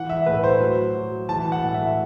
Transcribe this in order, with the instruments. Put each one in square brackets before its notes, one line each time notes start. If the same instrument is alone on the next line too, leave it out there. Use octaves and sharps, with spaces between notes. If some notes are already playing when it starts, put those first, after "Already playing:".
Already playing: [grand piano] E3 F#5
E5
A2 B4
C5
F#3
F#3
E3 A5
F#5
A2
E5